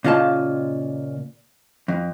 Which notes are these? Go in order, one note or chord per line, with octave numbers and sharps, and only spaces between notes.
A#2 C#3 F4 D#5 A5
F2